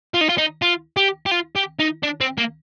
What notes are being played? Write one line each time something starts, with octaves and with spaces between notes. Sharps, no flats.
F4
D#4
F4
D#4
F4
G4
G4
F4
G4
D#4
D4
C4
A#3